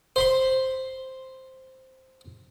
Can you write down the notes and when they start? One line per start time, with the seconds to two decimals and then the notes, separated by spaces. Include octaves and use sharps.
0.16 C5 B5 C6